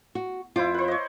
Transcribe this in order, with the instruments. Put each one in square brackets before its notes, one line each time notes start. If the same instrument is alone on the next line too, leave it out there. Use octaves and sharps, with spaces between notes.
[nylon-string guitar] F#4
[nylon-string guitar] F2 F4 [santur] E4 C5 D6
[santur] B4 C5
C#5 D#5